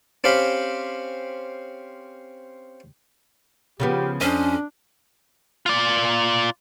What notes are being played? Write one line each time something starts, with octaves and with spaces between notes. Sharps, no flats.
C4 C#4 G4 F5 B5
C#3 F3 B3 G4
F2 C#4 D4 C5 D#5
F4 D5